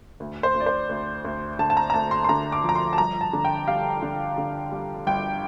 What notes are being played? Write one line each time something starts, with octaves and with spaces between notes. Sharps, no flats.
D2
C5
D2
D5
C5
D2
D2
D3 A5
A5
A#5
A#5
D2 A5
C6
C6
D3 A#5
D6
F3
A#5
C6
A5
G1 A#5
A5
D3
G5
G3 F5
D3
D3
G3
G1 G5